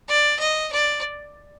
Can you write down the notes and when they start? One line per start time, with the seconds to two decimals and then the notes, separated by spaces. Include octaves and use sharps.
0.08 D5
0.39 D#5
0.73 D5